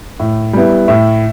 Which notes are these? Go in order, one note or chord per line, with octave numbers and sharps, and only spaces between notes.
A2
G3 B3 E4
A2 E5